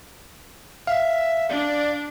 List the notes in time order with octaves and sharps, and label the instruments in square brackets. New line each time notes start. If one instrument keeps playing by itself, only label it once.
[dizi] E5 [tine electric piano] F5
[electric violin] D4 [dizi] D5